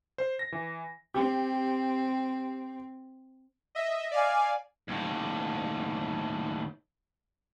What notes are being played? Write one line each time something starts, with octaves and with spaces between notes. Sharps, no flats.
C5
A#6
E3
C4 G4
D#5 E5
D5 F5 G#5
D#2 A2